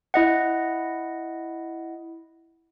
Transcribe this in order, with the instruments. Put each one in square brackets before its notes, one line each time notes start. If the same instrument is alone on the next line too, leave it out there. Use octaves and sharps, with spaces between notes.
[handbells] E4 D#5 F#5